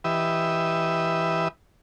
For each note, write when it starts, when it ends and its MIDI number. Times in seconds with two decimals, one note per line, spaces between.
0.04 1.48 52
0.04 1.48 67
0.04 1.48 71
0.04 1.48 75
0.04 1.48 76